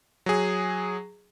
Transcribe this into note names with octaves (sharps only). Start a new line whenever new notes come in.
F#3 G#4